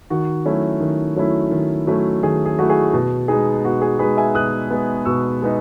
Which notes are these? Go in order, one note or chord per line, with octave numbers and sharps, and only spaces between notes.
D#3 F#4
F#3 A3 C#4 E4
D#3
F#3 A3 C#4 E4
D#3
F#3 A3 C#4 E4
D#3 G#4
G#4
F#3 A3 C#4 E4 F#4
G#4
B2
G#3 B3 D#4 G#4
B2 F#4
G#4
G#3 B3 D#4 G#4 B4
E5 G#5
B2 D#6 F#6
G#3 B3 D#4
B2 C#6 E6
G#3 B3 D#4